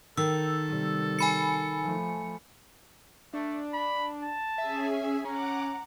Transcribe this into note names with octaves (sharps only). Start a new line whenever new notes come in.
D#3 A4 E6
C3 G3
G#5 B5 C#7
F3 A3
A3 D4
B5
A5
C#4 G#4 E5 G#5
C#4 F#5 A#5 D6